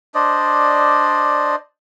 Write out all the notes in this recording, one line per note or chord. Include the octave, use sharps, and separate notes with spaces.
D4 C5 D5 D#5